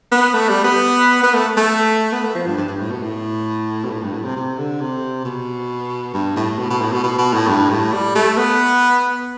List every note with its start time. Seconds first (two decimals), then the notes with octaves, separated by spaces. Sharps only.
0.12 B3
0.34 A3
0.49 G3
0.64 B3
1.23 B3
1.34 A3
1.57 A3
2.12 B3
2.24 A3
2.35 F3
2.46 G2
2.57 G2
2.68 G2
2.79 A2
2.91 B2
3.02 A2
3.84 B2
3.91 A2
4.03 G2
4.13 A2
4.25 C3
4.36 C3
4.58 D3
4.81 C3
5.25 B2
6.14 G2
6.36 A2
6.59 B2
6.70 B2
6.81 A2
6.92 B2
7.04 B2
7.18 B2
7.34 A2
7.48 G2
7.70 A2
7.92 G3
8.15 A3
8.37 B3